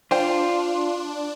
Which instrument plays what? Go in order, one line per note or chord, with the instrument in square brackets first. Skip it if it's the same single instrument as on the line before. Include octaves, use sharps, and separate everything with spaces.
[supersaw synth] D4 [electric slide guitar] F4 [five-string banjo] C5 G5